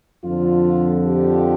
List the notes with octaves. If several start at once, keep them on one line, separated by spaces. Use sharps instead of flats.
F2 D3 F3 F4
G4